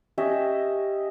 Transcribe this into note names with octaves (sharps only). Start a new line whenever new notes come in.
C#4 G4 D#5 E5